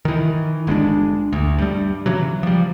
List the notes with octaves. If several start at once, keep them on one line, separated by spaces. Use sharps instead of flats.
D#3 E3
G1 G#3 C#4 D4
D2
G2 G3
C#3 E3 F#3
F3 G3